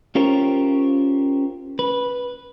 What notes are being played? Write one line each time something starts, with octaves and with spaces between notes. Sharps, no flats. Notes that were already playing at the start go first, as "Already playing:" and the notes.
C#4 F4 G4 A#4 C5 C#5
B4